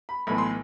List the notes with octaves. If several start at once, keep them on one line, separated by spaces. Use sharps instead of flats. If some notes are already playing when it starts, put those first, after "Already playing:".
B5
B1 A2 E3 B5
C6